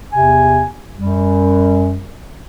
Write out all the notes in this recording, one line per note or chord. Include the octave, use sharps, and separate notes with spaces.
E2 C3 G#5
F#2 G3